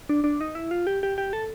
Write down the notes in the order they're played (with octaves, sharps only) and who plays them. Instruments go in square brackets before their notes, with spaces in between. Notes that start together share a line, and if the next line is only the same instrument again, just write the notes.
[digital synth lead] D4
D4
D#4
E4
F4
G4
G4
G4
A4